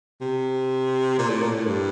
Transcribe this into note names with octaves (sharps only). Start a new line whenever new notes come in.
C3
A#2
A2
A#2
A2
G2